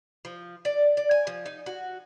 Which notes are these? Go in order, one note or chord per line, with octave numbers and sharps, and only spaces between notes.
F3
D5
D5
G#5
F3
D#4
F#4